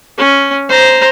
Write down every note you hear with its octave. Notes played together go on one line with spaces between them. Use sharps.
C#4
C5 A#5